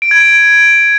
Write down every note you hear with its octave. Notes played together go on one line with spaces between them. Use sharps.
D7
G#6
D7